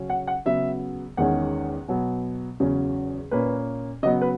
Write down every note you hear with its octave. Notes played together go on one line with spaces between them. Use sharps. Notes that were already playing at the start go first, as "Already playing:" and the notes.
Already playing: C#3 F#3 C#4
F#5
F#5
C#3 F#3 B3 E5
E2 D#3 G#3 C#4 F#5
B2 F#3 B3
E2 C#3 F#3 C#4
A#2 A#3 C#4 B4
C#3 F#3 B3 D#5
B4